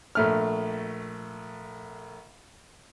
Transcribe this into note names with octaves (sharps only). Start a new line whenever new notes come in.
A#1 A3 F6